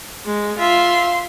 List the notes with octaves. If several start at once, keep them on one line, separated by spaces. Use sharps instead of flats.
G#3
F4 E5 F5 C6